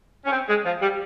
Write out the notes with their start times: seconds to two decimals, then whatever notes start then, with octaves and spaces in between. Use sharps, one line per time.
0.24 C#4
0.31 C4
0.48 G#3
0.65 F3
0.81 G3